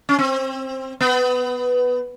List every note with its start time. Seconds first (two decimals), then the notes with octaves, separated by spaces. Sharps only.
0.09 C#4
0.19 C4
1.01 B3